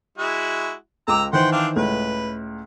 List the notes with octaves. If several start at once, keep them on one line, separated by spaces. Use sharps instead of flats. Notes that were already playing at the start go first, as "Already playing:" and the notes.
G#3 E4 F#4
C#2 G5 A#5 D6 E6
D#3 E3 C5 F#5 G5 C6
C4 D4 F5
C#2 A2 B4